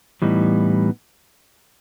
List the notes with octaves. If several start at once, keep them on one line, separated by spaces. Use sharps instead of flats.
A2 E3 G3 B3 D#4